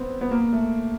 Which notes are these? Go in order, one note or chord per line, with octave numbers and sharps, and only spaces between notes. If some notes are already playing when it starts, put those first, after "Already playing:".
Already playing: B3 C4
B3
A#3
A3